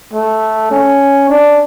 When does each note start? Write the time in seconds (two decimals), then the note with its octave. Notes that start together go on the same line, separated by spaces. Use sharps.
0.13 A3
0.71 C#4
1.29 D4